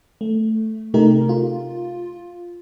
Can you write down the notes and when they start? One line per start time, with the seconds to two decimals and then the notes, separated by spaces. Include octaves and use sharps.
0.21 A3
0.94 C3 A3 D#4 G4 A#4
1.29 F4